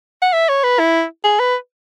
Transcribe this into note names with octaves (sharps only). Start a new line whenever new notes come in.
F#5
E5
C#5
B4
E4
G#4
B4